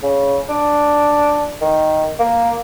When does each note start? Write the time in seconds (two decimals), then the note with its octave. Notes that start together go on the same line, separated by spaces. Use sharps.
0.03 C#3
0.49 D4
1.61 D#3
2.19 A#3